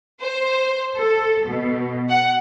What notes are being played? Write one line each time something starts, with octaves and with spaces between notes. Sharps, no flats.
C5
A4
B2
F#5